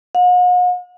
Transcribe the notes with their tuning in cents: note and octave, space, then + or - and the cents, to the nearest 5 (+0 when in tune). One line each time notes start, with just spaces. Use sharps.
F#5 -45